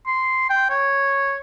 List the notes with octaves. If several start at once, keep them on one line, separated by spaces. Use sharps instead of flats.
C6
G5
C#5